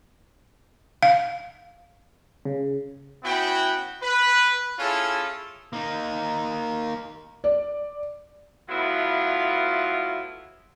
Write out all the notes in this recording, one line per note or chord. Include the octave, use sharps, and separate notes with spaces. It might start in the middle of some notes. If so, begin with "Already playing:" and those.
F5
C#3
B3 C#4 E4 F#4 G5
B4
C#4 E4 F4 G#4 A4
A#3 D#4
D5
F#3 A3 B3 E4 F4